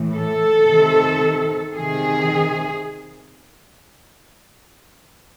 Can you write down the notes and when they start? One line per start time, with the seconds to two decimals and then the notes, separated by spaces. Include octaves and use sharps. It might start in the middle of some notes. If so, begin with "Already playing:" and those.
Already playing: A2 E3
0.13 A4
0.67 C3 D#3
1.75 C3 D#3 G#4